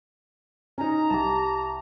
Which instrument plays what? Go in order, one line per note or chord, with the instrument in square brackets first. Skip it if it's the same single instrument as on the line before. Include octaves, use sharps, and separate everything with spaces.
[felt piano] C#4 D#4 [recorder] A#5
[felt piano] C2 [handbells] G4 A5